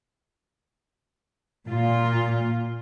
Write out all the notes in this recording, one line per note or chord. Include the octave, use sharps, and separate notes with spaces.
A#2 F4